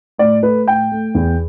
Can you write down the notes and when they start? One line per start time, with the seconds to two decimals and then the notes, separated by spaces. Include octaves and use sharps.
0.18 A2 D5
0.42 A3 B4
0.66 A2 G5
0.91 A3
1.15 E2